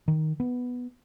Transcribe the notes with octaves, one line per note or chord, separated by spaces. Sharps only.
D#3
B3